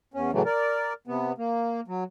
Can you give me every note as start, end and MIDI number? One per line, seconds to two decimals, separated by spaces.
0.14 0.31 40
0.14 0.31 61
0.33 0.42 45
0.33 0.42 49
0.33 0.42 52
0.33 0.42 54
0.33 0.42 57
0.46 0.93 70
0.46 0.93 74
1.07 1.32 48
1.07 1.32 59
1.38 1.81 58
1.88 2.04 54